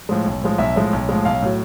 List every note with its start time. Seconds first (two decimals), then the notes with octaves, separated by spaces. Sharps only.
0.09 A2 F3 G#3
0.26 B1
0.42 A2 F3 G#3
0.58 B1 E5
0.76 A2 F3 G#3
0.93 B1
1.09 A2 F3 G#3
1.25 B1 F5
1.42 A2 F#3